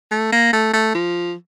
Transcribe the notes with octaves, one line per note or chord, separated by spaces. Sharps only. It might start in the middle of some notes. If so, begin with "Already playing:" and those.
A3
A#3
A3
A3
F3